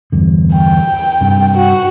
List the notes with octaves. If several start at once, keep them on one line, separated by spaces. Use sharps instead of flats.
E2 G2 D3
G5
G2 C3
F#4